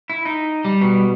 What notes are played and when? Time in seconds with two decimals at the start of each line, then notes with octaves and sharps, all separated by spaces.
0.10 E4
0.25 D#4
0.65 G3
0.81 B2